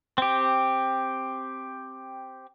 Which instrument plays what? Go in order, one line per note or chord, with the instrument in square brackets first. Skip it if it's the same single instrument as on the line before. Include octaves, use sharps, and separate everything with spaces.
[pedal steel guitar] C4 G4